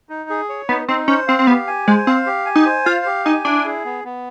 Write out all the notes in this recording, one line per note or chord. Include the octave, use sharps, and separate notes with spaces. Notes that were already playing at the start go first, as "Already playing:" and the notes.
D#4
G#4
C#5
B3 D#4
C4 D#4
C#4 C5
C4 F5
C4
B3 G4
G#5
G#3 C5
C4 F5
G4
G#5
D#4
C5
F4 F5
G4
D#4 G#5
D4 E4
G#4
B3
B3